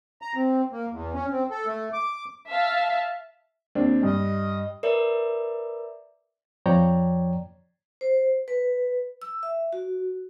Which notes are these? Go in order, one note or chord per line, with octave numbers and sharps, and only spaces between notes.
A#5
C4
A#3
E2
C#4
C4
A4
A3
D6
E5 F5 A5
D#2 C4 D4
G2 D#5
A#4 B4 D5 E5
F2 F3 C#5 D5 G5 A#5
C5
B4
E6
E5
F#4